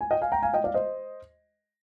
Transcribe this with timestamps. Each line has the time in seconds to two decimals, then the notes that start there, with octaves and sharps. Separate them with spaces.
0.01 G#5
0.11 D#5 G5
0.21 F5 G#5
0.32 G5 A#5
0.42 F5 G#5
0.53 D#5 G5
0.64 D5 F5
0.74 C5 D#5